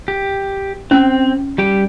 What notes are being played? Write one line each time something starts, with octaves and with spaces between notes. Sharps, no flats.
G4
C4 C#4
G3 G4 G5